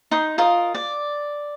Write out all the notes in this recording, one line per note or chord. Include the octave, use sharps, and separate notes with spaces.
D#4 C6 D#6
F4 A#4 D#5
D5